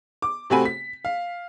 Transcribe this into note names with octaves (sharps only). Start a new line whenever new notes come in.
D6
C3 A3 C4 F#4 G#5 B5
B6
F5